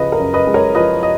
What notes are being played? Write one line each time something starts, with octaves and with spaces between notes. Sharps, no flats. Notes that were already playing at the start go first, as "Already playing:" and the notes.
Already playing: C#3 F3 B4 D#5
A#4
F#2
B4 D#5
G#3
A#4 C#5
F3 B4 D#5
D#5